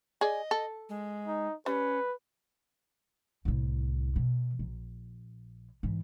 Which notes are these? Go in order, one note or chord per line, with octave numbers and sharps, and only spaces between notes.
G#4 D5 D#5
A4
G#3
D#4
G3 C#4 B4
C2 A2
B2
A#1
G#2 E3